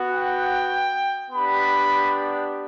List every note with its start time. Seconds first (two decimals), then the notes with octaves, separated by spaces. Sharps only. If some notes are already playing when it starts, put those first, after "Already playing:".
Already playing: B3 F#4
0.12 G5
1.31 B3 D4 G4 B5